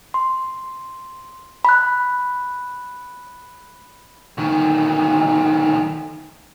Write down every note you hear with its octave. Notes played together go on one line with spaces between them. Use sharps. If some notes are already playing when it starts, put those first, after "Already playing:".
C6
B5 F#6
D2 D#3